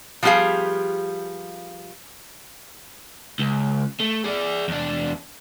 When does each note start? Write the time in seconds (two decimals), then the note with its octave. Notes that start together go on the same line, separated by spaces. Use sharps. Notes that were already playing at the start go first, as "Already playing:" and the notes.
0.23 F3 G3 B3 G4 G#4 F5
3.39 C#2
4.01 A3
4.24 G#4 D5
4.68 E2 D4